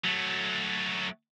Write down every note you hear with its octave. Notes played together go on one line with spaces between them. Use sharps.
F#3 A3